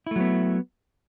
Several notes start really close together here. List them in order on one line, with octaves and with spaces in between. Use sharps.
E4 A3 F#3 B3